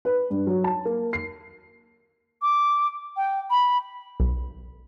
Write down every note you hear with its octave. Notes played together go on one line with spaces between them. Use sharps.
B4
G2
F#3
A5
A#3
C7
D6
G5
B5
B1